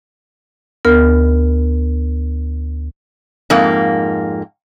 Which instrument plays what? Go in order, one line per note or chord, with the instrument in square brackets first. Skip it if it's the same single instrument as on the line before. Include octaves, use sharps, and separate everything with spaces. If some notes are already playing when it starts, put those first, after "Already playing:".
[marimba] D2 B3 A#4 F6
[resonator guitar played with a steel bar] F2 G#2 A#3